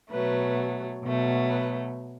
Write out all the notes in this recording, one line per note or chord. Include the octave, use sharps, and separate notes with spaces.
B2 F#3 A3 B4
B2 F#3 A3
B4